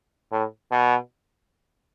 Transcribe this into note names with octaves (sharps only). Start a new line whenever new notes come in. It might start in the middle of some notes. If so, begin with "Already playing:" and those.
A2
B2